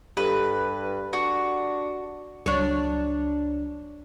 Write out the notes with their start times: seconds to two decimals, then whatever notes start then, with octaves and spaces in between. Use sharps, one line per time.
0.17 G2 G4 A4 B4
1.13 D4 F#4
2.46 C#2 F#3 D4 C#5